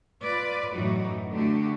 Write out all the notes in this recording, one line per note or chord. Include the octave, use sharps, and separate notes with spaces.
F4 B4 D5
F#2 A2 E3 D#4 F#4
D3 A3 D4 F#4 G4